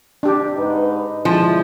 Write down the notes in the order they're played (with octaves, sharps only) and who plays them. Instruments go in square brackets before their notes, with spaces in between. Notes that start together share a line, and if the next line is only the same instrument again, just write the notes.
[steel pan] D4 G4
[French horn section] G#2 D#4 B4
[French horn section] D3 G#3 E4 [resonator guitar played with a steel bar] F3